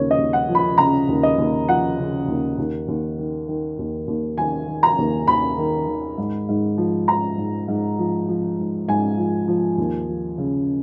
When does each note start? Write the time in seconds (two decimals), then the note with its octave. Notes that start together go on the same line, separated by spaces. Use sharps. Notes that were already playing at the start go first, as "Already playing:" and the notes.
Already playing: D#2 C#3 F3 C#5
0.11 D#5
0.18 D#2
0.33 F#5
0.49 F3
0.55 B5
0.78 C#3 A#5
1.09 D#2
1.23 D#5
1.38 D#2
1.68 F3 F#5
1.98 C#3
2.28 D#2
2.58 D#2
2.88 D#2
3.19 D#3
3.48 D#3
3.79 D#2
4.07 D#2
4.37 D#3 G#5
4.68 D#3
4.83 A#5
4.98 D#2
5.28 D#2 B5
5.58 D#3
5.88 D#3
6.18 G#2
6.49 G#2
6.78 F3
7.08 F3 A#5
7.37 G#2
7.68 G#2
7.98 F3
8.28 F3
8.58 G#2
8.88 G#2 G#5
9.18 F3
9.48 F3
9.78 D#2
10.09 F3
10.38 C#3